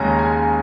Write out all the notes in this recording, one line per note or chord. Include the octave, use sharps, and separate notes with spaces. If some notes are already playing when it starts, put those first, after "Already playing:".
Already playing: D#2 C#3 G#3 C#4 G#5 A#5
G#5